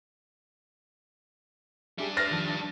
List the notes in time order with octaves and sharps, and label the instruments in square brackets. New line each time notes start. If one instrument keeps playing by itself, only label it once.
[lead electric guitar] G3 D4 [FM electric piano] G4 G#4 E5
[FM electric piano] B4 E5 C7 [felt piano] F6 A6 A#6
[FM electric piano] D#3 F3 A5